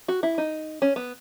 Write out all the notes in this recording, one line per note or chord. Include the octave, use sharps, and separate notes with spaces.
F#4
E4
D#4
C#4
B3